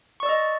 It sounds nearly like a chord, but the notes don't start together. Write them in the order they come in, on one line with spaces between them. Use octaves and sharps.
C#6 D5 E6 D#5